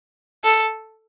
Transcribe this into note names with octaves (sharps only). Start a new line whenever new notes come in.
A4